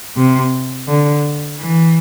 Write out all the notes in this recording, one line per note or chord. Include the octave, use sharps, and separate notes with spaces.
C3
D3
E3